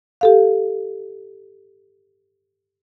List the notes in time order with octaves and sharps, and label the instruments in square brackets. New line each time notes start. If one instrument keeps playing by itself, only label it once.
[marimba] G4 A4 F5